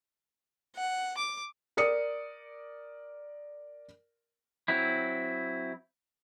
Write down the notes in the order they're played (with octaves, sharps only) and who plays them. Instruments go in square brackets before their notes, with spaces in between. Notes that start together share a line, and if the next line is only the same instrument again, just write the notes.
[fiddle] F#5
D6
[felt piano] A#4 D5 D#6 C#7
[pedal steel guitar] F#3 C4 E4